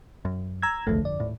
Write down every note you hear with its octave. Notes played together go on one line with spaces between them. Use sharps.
F#2
A#5 E6 G#6
G1 C2 F2 D3 A3
D5
D#1 A2